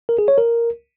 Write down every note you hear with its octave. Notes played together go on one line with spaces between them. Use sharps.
A#4
G#4
C#5
A#4